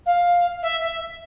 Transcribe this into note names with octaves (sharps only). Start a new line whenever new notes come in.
F5
E5
E5